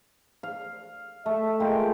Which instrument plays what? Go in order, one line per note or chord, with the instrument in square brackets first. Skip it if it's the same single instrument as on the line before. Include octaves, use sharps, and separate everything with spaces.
[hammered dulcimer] F5
[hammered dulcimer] A3 [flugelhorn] E5
[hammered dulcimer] G#3 A#3 F4 [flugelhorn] G5